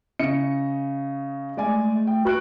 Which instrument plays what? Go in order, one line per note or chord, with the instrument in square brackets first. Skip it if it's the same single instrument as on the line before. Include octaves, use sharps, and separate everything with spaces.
[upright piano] C#3 D#5 C#7
[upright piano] G#3 D5 G#5 [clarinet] A3
[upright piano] G5
[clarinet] F#4 [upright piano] B4 F#6 D7